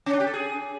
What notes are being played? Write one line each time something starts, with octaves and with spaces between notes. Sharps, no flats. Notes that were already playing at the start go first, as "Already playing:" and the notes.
C#4
D4
G4
A4
G#4